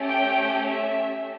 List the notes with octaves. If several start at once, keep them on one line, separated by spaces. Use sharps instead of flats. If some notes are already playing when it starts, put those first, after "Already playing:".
Already playing: A3 C#4 G4
G5
E5